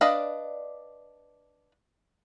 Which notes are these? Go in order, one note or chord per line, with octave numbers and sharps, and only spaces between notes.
D4 B4 D5 D#5 F5